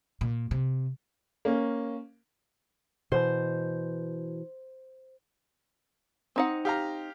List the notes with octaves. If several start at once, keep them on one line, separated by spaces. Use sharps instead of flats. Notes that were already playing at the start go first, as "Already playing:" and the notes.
A#2
C3
A#3 C#4
B2 E3 C5
C4 D#4 F#5
G4 F5 A#5